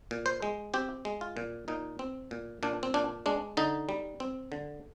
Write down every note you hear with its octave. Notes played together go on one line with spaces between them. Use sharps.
A#2
C5
G#3
C4 G4
G#3
F4
A#2
A#2 D#4
C4
A#2
A#2 D4
C4
A#2 D4
G#3 D4
D3 D#4
G3
C4
D3